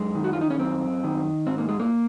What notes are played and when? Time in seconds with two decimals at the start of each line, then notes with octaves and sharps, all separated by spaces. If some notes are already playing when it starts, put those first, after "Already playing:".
Already playing: F#2 G#3
0.15 D#3
0.24 F#4
0.33 F4
0.41 D#4
0.50 C#4
0.59 F#2 C4
1.04 D#3
1.47 G#2 C4
1.58 A#3
1.69 G#3
1.80 A#3